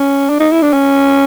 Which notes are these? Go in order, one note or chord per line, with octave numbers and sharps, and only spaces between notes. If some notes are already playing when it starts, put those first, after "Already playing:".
Already playing: C#4
D4
D#4
E4
D4
C#4